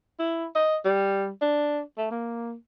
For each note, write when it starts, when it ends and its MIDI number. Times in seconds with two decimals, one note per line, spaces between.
0.19 0.46 64
0.55 0.76 75
0.85 1.29 55
1.42 1.80 62
1.98 2.10 57
2.11 2.54 58